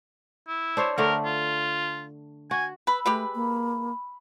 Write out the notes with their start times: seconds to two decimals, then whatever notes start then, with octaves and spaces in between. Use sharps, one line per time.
0.48 E4
0.77 D4 C5 C#5
0.98 D3 A3 D4 A#4
1.25 F4
2.51 F#4 G#5
2.87 B4 B5 E6
3.06 G#3 A3 G4 B4
3.35 A#3